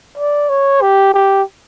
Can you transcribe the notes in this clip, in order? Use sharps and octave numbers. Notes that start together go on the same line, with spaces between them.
D5
C#5
G4
G4